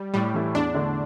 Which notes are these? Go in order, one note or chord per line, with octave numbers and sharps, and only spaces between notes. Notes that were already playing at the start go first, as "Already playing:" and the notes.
Already playing: G3
A2 G3
E3 A3 E4
E2 D4
D3 A3 D4